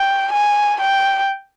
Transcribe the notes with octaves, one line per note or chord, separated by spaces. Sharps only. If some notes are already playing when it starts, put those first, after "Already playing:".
Already playing: G5
G#5
G5